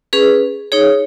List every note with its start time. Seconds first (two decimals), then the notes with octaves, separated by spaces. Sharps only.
0.13 C#4 G#4 B4
0.72 D#4 G#4 C#5